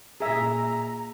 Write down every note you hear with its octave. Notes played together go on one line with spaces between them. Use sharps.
A#2 G#4 E5 G#5 A#5